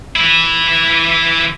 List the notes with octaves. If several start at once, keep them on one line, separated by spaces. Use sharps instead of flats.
E3 E4